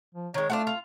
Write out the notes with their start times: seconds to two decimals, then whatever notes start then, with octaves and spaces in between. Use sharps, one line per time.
0.15 F3
0.34 D#3 G#3 C#5
0.50 A3 D4 F4 F#5
0.67 F4